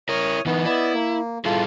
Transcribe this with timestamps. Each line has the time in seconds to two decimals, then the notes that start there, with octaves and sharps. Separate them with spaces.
0.09 E4 A#4 C#5 D#6 F6
0.46 E3 B3 D#4
0.65 B3 E4 D5 D#5
0.94 A#3
1.45 G3 E4 F4 G#4 A4